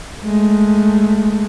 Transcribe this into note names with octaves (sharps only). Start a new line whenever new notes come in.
G#3 A3